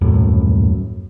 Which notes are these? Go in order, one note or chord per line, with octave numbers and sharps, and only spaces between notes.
D#1 F#2 A2